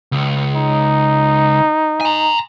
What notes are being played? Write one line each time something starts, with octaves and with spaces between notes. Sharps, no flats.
C#2
D#4
G#5 A#5